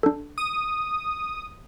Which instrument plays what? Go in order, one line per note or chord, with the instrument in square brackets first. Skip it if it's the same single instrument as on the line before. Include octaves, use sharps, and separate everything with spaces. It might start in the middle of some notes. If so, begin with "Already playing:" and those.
[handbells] D4 A4
[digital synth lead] D#6